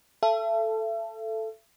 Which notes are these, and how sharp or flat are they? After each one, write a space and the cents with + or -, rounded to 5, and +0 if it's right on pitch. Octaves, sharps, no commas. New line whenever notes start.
A4 +0 E5 +40